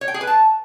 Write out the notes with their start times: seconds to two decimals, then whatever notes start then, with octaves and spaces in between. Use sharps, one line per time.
0.01 C#5
0.08 G5
0.14 G#4
0.21 B4
0.27 A5